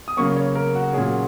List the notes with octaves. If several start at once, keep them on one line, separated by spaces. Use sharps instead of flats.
D#6
C#3 F#3 A#3 C#4 C#6
C#5
A#4
F#4
A#2 F#3 C#4 G#4
F#4